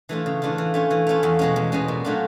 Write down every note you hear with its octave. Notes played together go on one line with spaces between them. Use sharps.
E3 A3 D4 F4
C#3
E3 A3 D4 F4
E3
A3 C#4 F4
E3
A3 C#4 F4
E2
B2 G#3 C#4
E2
B2 G#3 C#4
A#2
F#3 A3 D4 F4